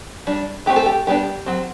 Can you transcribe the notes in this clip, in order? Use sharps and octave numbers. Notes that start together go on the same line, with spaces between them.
G3 D4
E3 A3 C4 G4
A4
G4
G3 B3 D4 G4
F#3 C4